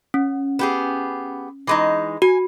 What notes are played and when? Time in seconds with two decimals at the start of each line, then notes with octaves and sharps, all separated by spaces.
0.14 C#4
0.59 B3 G4 G#4
1.67 E3 G#3 D#4
2.22 F#4 G#5